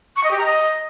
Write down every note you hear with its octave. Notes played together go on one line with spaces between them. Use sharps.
C#6
D#5
G4
A#5
D#5